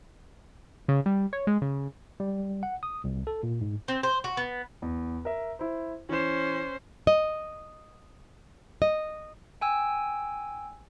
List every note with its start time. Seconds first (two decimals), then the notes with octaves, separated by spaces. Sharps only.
0.88 C#3
1.06 G3
1.33 C#5
1.47 G#3
1.62 C#3
2.20 G3
2.63 F#5
2.83 D#6
3.04 C2
3.27 A4
3.43 A#2
3.61 G#2
3.88 C4
4.03 C5
4.24 F#4
4.37 B3
4.82 E2
5.25 A#4 E5
5.59 E4 C5
6.09 E3 C#4 C5 E7
7.07 D#5
8.82 D#5
9.61 G5 G#5 E6